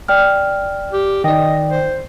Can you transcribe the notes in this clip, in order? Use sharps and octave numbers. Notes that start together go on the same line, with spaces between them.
D5 G5 F6
G4
D#3 D5 D#5 G5
C5